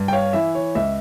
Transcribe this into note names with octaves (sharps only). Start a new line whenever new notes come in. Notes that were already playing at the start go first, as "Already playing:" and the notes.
Already playing: G2
G5
C#5 F5
E3 E5
C#5
C#2 E5